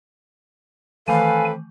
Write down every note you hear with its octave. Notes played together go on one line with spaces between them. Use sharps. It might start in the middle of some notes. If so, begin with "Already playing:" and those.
D#3 E3 A3 C4 A4 B4 F5 G#5